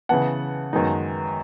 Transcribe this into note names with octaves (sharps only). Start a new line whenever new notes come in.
C#3 E3 B3 F#5 A5
F#2 D#3 G#3 B3 D#4